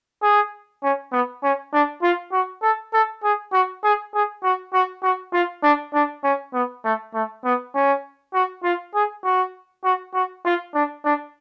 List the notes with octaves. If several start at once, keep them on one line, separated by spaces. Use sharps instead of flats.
G#4
C#4
B3
C#4
D4
F4
F#4
A4
A4
G#4
F#4
G#4
G#4
F#4
F#4
F#4
F4
D4
D4
C#4
B3
A3
A3
B3
C#4
F#4
F4
G#4
F#4
F#4
F#4
F4
D4
D4